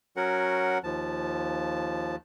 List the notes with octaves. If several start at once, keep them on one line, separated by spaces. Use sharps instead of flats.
F#3 C#4 F#4 A#4 F#5
D#2 F3 A5